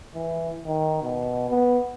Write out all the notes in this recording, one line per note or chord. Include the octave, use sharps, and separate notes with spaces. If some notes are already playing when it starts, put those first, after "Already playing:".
E3
D#3
B2
B3